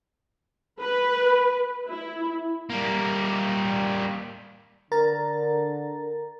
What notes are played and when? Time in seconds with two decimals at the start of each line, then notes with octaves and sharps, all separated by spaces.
0.80 B4
1.87 E4
2.70 G3 A#3
4.92 D3 A#4 A#5 A6